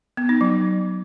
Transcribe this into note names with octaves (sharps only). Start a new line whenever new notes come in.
B3
D#4
F#3